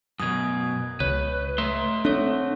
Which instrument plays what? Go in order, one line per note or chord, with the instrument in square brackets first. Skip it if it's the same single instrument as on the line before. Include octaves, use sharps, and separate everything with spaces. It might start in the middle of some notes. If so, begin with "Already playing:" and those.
[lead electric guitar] F#2 B2 [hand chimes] D#6 G#6
[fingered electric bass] C#2 [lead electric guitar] B4 [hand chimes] C#5
[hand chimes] A3 [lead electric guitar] E5 C6
[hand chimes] C4 A4 C#5 [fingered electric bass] D4